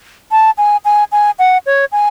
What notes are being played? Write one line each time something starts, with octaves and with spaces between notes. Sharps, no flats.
A5
G#5
G#5
G#5
F#5
C#5
G#5